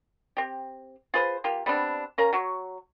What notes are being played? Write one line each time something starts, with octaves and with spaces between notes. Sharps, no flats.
C4 G4
F4 G#4 B4 C5
A#3 F4 G4
G3 B3 C4 D4
C#4 A#4 F5 A#5
F#3 F#4 C#5